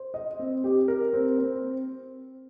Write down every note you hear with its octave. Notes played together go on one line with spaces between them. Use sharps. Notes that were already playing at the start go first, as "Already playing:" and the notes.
Already playing: C5
D#5
C4
G4
A#4
C4
C4